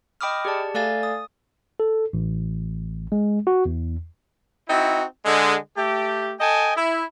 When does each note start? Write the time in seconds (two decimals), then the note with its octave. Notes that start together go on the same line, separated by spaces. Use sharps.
0.21 D#5 G5 B5 D6 D#6 F6
0.45 G4 G#4 D5 A5
0.74 A3 A4 D5 F5 G#5 A6
1.03 D#6
1.80 A4
2.13 A1
3.12 G#3
3.47 F#4
3.65 E2
4.69 C4 D#4 E4 F#4
5.25 D3 G#3
5.77 A3 G4
6.40 A4 D#5 G5 G#5
6.76 E4